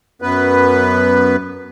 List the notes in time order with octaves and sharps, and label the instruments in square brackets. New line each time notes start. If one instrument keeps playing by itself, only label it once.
[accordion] F#2 B3 B4